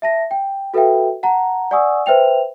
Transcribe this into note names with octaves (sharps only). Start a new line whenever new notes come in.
E5 A5 A#6
G5
F#4 A4 B4 E5 F5 G5
F#5 A5 A#5
D5 F#5 G#5 C#6 D#6 E6
B4 C5 E5 G5 F7